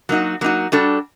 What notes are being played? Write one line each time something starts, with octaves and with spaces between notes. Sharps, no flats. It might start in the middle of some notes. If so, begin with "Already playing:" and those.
F#3 A#3 D#4 F#4
F#3 A#3 D#4 F#4
G3 D4 F#4 A4